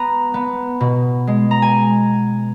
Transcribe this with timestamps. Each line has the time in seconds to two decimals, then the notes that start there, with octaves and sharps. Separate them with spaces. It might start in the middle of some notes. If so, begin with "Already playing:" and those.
Already playing: B3 A#5
0.34 B3
0.80 B2
1.27 G#3
1.51 A#5
1.62 G#5